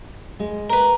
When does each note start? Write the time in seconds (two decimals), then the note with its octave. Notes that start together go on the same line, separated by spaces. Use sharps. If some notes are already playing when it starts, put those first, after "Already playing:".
0.40 G#3
0.70 A#4 B4 A#5